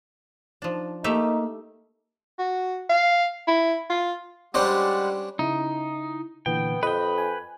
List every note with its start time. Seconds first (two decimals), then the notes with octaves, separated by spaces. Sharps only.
0.62 F3 D4 D#4
1.04 A3 A#3 D#4 G4 E5
2.39 F#4
2.89 F5
3.48 E4
3.90 F4
4.54 G3 G#3 C#4 D4 G4 C5 F#5
5.39 C#3 D#4 E4
6.46 A#2 D3 E3 B3 G5
6.83 F2 B4 D#5 G5
7.18 G#5